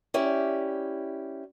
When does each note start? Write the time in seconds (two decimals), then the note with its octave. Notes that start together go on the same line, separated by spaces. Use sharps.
0.14 C#4 E4 G4 D5